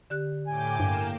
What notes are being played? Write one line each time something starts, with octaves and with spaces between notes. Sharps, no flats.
D3 G4 F#6
A2 G5 G#5 D6
G2 A#3 E7